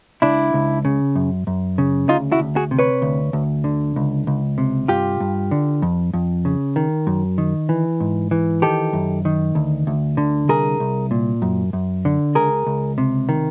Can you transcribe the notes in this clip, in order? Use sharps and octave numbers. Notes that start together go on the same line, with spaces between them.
C#2 D4 E4
C#2
C#3
F#2
F#2
C#3
D2 D#4 F4
E4 F#4
D2
F#4 G#4
C3
B4 C#5
D2
D2
D3
C#2
C#2
C3
G2 F4 G4
G2
D3
F2
F2
C#3
D#3
F#2
D#3
E3
G#2
E3
D#3 G4 A4
F#2
D#3
D2
D2
D3
C2 G#4 A#4
C2
A#2
F#2
F#2
D3
C#2 G#4 A#4
C#2
C3
D#3